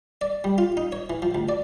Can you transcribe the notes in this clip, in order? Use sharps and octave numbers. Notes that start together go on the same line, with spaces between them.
D5
G3
F4
D#4
C#5
E3
F3
D2
D5